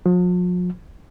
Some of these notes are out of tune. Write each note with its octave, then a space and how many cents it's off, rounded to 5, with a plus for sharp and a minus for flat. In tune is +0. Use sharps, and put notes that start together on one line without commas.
F3 +45